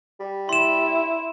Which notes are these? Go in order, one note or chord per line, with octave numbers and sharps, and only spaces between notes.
G3
E4 C6 E7